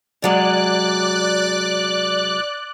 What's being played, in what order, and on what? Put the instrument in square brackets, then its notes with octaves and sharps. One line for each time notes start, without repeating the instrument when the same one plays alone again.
[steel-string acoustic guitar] C3 F#3 G#3 [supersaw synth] D5 F#6